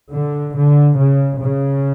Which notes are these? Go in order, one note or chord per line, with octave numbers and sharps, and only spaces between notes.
D3
D3
C#3
C#3